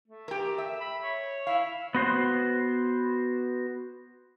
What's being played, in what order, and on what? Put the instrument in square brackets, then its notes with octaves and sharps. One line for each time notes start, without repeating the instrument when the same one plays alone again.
[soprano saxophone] A3
[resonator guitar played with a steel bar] G4 A#4
E5
[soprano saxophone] B5
C#5
[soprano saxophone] E4 [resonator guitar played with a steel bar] F5
[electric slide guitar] B3 F#4 C5